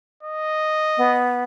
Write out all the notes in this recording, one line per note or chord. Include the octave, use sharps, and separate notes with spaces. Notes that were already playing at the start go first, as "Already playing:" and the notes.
D#5
B3